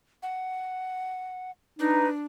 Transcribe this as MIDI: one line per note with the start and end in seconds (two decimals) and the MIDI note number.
0.23 1.51 78
1.79 2.26 62
1.79 2.08 63
1.79 2.08 71